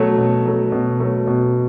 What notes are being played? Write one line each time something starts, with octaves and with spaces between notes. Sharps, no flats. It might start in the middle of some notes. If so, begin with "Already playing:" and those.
Already playing: B2 F#3 A3
B2
F#3 A3
B2
F#3 A3
B2